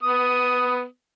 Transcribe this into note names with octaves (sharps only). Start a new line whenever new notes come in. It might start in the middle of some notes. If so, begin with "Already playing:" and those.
B3 D#6